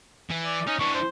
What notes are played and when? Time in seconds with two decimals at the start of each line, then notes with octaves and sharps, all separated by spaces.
0.30 E3
0.45 D5
0.67 C#4 D#4
0.79 E3 D4 C#6
0.94 C5